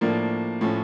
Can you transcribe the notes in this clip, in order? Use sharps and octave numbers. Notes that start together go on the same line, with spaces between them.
A2 F3 A#3 D4
A2 F3 C#4